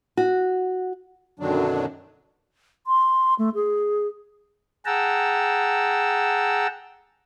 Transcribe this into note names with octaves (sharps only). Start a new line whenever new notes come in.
F#4
F#2 B2 D3 D#3 F#3 D4
C6
A3
G#4
G#4 F#5 G5 A5 A#5 E6